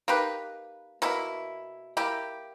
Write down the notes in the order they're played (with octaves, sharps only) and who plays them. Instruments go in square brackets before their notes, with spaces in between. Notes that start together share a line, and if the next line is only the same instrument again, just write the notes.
[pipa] A#3 D#4 G4 B4
B2 A#3 E4
A#3 E4 G4